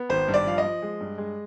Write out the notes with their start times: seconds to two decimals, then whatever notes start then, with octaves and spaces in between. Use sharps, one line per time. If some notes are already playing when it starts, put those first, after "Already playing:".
Already playing: B3
0.09 G#1 C5
0.28 G2
0.34 D5
0.46 F3 F5
0.58 D#5
0.64 F3
0.82 G#3
1.01 G2
1.18 G#3